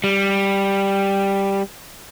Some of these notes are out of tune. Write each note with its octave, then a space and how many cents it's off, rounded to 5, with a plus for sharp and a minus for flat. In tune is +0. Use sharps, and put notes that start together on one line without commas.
G3 +5